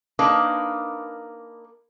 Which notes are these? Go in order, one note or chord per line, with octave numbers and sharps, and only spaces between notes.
A#3 D4 D#4 A#4 B4